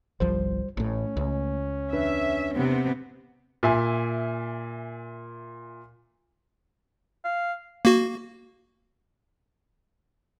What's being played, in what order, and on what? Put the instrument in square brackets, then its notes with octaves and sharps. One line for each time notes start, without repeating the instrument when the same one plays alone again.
[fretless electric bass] G1 C2 F3 [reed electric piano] G3 C5
[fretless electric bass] A1 A2 [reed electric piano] A3 [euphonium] C#4
[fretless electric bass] C#2
[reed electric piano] E2 D4 B4 [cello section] E5
[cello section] C3 B3 C4
[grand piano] A#2 E5 G#5
[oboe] F5
[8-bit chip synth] A#3 F#4